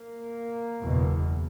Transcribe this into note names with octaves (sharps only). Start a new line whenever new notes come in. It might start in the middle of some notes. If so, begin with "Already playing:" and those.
Already playing: A#3
F#1 E2 B2